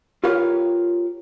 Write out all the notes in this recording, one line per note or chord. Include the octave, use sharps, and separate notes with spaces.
F4 G4 A#4 B4 C#5 F5